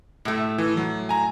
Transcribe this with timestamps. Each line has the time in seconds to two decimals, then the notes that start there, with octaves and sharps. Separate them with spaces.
0.25 A2 A3
0.58 E3
0.77 F#3
1.09 G#5 A#5